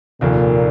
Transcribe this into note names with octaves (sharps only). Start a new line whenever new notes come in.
F1 D#2 A#2 D#3